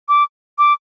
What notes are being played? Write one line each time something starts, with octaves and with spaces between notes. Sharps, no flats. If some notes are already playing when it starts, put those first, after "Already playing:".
D6
D6